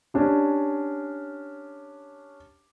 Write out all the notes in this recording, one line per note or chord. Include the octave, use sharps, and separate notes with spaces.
C#4 D4 G4